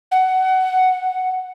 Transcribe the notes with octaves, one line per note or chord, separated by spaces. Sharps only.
F#5